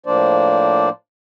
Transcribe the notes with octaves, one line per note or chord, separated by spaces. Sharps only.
A2 F3 A#3 D4 C5 D5